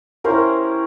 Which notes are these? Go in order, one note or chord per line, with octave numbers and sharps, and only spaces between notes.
C#4 E4 G4 A#4 C5